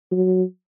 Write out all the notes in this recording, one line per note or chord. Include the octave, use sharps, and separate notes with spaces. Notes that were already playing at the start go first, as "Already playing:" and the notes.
F#3